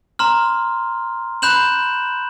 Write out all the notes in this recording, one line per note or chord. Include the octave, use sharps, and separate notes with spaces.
A#5 C6 F6
B5 F#6 G6 E7 F#7